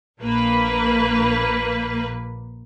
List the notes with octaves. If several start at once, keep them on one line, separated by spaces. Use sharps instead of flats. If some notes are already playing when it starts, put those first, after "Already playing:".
A#1 A#3 B4